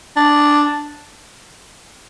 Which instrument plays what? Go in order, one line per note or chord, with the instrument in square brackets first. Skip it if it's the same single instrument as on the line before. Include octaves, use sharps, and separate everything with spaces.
[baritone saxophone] D4